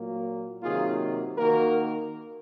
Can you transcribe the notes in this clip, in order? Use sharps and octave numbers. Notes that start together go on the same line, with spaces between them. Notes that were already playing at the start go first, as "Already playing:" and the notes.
Already playing: A#2 F#3 A#3
C3 D#3 F#3 A#3 F4 G#4
D#3 A#3 F#4 A#4